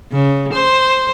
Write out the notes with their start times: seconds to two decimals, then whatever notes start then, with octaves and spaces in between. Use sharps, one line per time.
0.12 C#3
0.54 C5